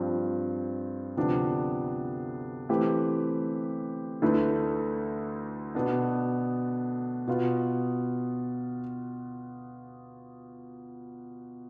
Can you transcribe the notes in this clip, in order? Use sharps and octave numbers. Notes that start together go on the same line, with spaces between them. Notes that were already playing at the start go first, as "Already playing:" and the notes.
Already playing: G2 F3 C4
D2 C3 F3 B3 D4
E3 A3 C4 G4 B4
D2 D3 A3 E4 B4
B2 B3 D4
B2 B3 F4